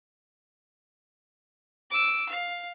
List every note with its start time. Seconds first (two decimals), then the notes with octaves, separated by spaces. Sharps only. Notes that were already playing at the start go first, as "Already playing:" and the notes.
1.91 D6 E6
2.29 F5